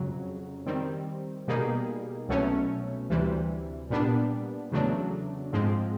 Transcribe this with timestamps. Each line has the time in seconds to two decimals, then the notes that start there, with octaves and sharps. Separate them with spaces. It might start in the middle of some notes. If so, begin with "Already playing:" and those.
Already playing: F2 C#3 F#3
0.66 D#3 G3 C4
1.48 B2 G3 A#3 D#4 G#4
2.29 C2 B2 F#3 A3 C#4
3.10 D2 C3 E3 G3
3.90 A#2 G3 B3 D4
4.71 E2 C#3 F#3 A3 D4
5.53 G#2 F3 G#3 C4